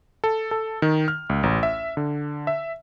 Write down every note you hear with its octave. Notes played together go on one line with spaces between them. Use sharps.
A4
A4
D#3
F6
C#2
A1
E5
D3
E5